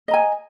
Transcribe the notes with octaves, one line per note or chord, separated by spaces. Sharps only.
D#5 G#5 A#5